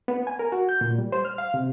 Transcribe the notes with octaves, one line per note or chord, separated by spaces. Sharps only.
B3
G#5
A#4
F#4
G6
A#2
G3
C5
F6
F5
C3